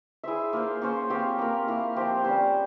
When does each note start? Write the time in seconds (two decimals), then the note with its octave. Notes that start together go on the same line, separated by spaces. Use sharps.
0.24 E4 G#4 C5 E5
0.53 A#3 F4 C5
0.81 A#3 C#4 F4 C5
1.10 C4 G4 C#5 F5
1.39 A#3 F4 A#4
1.67 A#3 E4 A#4 F5
1.96 F3 C4 G4 C5
2.24 G3 C#4 G4 C5